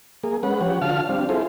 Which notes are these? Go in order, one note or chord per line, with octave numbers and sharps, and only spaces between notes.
A#3 G#4
G#3 C#4 B4 F#5
F3 G4 C#5 F#5
D3 F4 F#4 F5 A5 F6
G3 C4 D4 F5
E4 F4 G#4 A4 C5